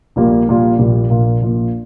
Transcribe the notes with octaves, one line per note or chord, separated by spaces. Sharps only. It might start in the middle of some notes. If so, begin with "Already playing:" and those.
A#1 A#2 G3 A#3 F4
A#1 A#2 G3 A#3 F4
A#1 A#2 G3 A#3 F4
A#1 A#2 A#3 F4
A#1 A#2 A#3 F4